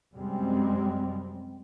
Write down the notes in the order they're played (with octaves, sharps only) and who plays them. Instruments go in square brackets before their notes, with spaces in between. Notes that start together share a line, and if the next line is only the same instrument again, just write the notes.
[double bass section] F#2 C3 G3 G#3 C4